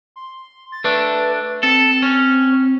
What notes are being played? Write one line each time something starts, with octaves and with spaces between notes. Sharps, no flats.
C6
A6
A3 D4 B4
C4 A4
C#4